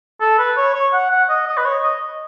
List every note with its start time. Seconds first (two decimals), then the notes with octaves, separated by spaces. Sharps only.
0.21 A4
0.39 B4
0.57 C#5
0.75 C#5
0.93 F#5
1.11 F#5
1.29 D#5
1.47 D#5
1.57 B4
1.65 C#5
1.83 D#5